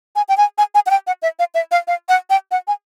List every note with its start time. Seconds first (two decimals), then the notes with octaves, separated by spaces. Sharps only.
0.16 G#5
0.29 G5
0.38 G#5
0.58 G#5
0.75 G#5
0.86 F#5
0.91 G5
1.07 F#5
1.22 E5
1.39 F5
1.54 E5
1.71 F5
1.88 F5
2.09 F#5
2.30 G5
2.51 F#5
2.68 G#5